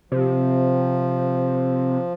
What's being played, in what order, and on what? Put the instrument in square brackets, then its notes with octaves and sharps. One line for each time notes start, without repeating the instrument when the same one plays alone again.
[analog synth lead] C3 [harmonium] F3